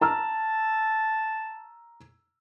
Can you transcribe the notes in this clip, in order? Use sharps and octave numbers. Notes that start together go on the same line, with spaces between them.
A5 A#5 E6 F6